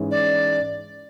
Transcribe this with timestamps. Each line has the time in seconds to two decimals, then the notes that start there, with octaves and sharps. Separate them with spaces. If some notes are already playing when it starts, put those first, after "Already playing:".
Already playing: G#2 E3 G#3 C#4
0.11 D5